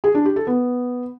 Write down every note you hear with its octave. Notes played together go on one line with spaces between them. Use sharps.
G#4
D4
G4
A4
B3